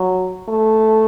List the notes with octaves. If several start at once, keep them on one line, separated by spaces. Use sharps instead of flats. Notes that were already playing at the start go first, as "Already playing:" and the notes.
Already playing: F#3
A3